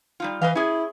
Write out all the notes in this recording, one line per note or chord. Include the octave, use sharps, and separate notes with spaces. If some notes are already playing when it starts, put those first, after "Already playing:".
G3 D#4 F4
E3 B4 D#5 F5
C#4 E4 G#4